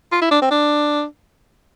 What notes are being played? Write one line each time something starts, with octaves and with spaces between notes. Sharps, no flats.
F4
E4
D4
C4
D4